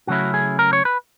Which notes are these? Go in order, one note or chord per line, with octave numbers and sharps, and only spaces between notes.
C#3 F#3 A3 C#4 E4 F#4
G#4
A#4
C#5
B4